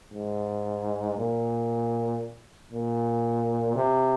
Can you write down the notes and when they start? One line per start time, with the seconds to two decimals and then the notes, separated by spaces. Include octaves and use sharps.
0.13 G#2
1.17 A#2
2.72 A#2
3.75 C3